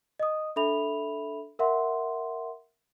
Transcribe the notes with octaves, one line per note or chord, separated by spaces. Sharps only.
D#5 D#6
D4 A4 E5 B5 F7
A#4 E5 F#5 C6